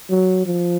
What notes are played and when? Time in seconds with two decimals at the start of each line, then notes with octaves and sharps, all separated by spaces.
0.10 F#3
0.46 F3